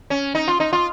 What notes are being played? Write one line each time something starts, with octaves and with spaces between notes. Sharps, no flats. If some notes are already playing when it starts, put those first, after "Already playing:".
C#4
D#4
F4
D#4
F4